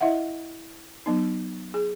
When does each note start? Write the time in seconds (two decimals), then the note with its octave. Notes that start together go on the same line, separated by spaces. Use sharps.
0.01 E4 D#5 E5 F#5
1.06 F#3 B3 D#4
1.74 G#4